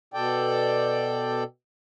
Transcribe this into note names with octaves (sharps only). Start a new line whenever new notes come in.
B2 A4 D5 G5